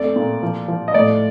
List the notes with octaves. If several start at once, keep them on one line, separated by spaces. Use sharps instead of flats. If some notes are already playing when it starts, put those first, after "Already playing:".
Already playing: F2 A3 D5
A#2
F3
F3
D#5
A2 D5